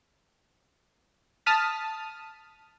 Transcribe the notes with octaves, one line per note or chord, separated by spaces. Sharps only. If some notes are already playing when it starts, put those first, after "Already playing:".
A5 D#6 F6 B6